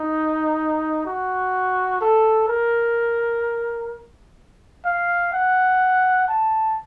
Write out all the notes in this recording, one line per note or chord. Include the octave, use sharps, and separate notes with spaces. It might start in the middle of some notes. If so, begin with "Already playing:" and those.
Already playing: D#4
F#4
A4
A#4
F5
F#5
A5